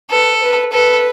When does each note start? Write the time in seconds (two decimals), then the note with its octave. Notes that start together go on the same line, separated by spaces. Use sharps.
0.11 A4 B4
0.42 B4
0.73 A4 B4